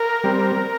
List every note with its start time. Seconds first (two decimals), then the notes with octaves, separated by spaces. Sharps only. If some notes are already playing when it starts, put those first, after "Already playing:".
Already playing: A#4
0.24 G3 C4